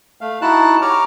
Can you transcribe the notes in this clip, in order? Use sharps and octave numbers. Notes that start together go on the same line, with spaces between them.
A3 F5
D#4 E4 F#4 A5 F#6
G4 C#5 A#5 D6 F6